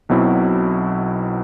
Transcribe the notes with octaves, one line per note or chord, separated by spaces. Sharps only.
B1 B2 F#3 C4 E4